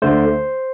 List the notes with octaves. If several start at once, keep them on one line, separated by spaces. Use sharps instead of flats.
D2 D3 A3 C5